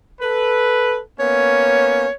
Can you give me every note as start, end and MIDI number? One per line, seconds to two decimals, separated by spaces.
0.21 0.99 69
0.21 0.99 71
1.20 2.07 58
1.20 2.07 59
1.20 2.07 61
1.20 2.12 73